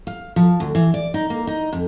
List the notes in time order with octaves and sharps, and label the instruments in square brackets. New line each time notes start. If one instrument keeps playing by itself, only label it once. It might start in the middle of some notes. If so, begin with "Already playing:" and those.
[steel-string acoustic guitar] F5
F3
D2
E3
D5
D#4
A#3
D#4
F2